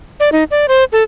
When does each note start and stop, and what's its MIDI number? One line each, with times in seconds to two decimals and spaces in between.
0.20 0.29 74
0.32 0.44 63
0.51 0.66 74
0.68 0.84 72
0.92 1.03 69